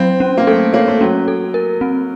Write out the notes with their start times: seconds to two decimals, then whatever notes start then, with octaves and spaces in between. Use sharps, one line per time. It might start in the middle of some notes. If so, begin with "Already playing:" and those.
Already playing: F#3 C4
0.20 C#4
0.37 A#3
0.47 A3 A4
0.74 A#3 C#5
0.88 A3
1.01 F#3 C#4
1.28 A4
1.54 A#4
1.81 C4